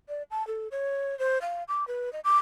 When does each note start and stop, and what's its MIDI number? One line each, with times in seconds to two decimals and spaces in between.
0.09 0.23 74
0.31 0.46 81
0.47 0.68 69
0.71 1.17 73
1.19 1.41 72
1.42 1.63 77
1.68 1.87 86
1.88 2.12 71
2.13 2.20 75
2.24 2.38 86